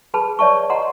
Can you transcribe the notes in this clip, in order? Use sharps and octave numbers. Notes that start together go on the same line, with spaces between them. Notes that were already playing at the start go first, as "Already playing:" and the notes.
G#4 B4 A5 B5
C#5 D5 E5 A5 C#6
D#5 F#5 A#5 C6